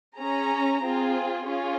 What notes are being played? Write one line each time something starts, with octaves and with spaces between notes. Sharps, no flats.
C#4 G#4 A#5
C4 F4 G#4
C#4 F4 G#4